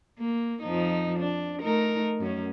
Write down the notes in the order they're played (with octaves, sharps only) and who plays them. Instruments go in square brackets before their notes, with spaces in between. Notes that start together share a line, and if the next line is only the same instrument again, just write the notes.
[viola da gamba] A#3
F2 F3 D#4
D4
A3 D#4 A#4
F#2 C#4